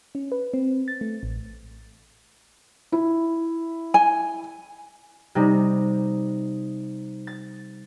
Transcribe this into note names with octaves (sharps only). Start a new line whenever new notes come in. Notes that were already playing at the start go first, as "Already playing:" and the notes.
C#4
B4
C4
A6
A3
A1
E4
G#5
C3 G3 D#4
A6